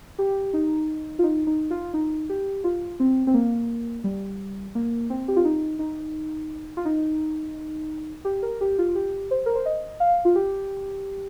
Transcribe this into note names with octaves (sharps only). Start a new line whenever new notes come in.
G4
D#4
F4
D#4
D#4
F4
D#4
G4
F4
C4
C4
A#3
G3
A#3
C4
G4
F4
D#4
D#4
F4
D#4
G4
A#4
G4
F4
G4
C5
A#4
C5
D#5
F5
F4
G4